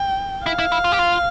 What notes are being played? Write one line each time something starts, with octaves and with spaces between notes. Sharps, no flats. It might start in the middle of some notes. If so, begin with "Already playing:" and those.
Already playing: G5
E4 F5
E4
E4
F4
G4
F4